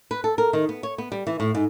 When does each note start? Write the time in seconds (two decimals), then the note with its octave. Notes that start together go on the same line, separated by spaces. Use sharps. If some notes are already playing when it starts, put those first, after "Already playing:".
0.11 B4
0.24 A4
0.38 A#4
0.53 D#3
0.69 B3
0.83 C#5
0.98 B3
1.12 G3
1.27 E3
1.40 A2
1.55 G#2